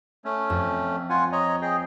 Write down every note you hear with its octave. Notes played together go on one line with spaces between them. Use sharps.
A3 C#4
F2
F4 F#5 G#5
C#5 D#5 A#5
G#4 D#5 G5